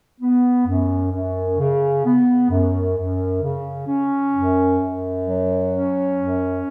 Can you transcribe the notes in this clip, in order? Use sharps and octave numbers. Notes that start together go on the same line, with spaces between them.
B3
F#2
F#2
C#3
B3
F#2
F#2
C#3
C#4
F#2
F#2
F#3
C#4
F#2